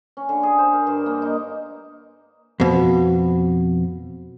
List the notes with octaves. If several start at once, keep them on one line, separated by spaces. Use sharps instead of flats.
C#4
D3
G#4
C5
A#4
G2
A#3
D#4
F2 B2